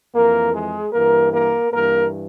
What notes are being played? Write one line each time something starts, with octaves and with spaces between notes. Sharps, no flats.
F2 E3 A#3 A#4
G#3 G#4
G2 E3 A#3 A#4
A#3 A#4
G2 E3 A#3 A#4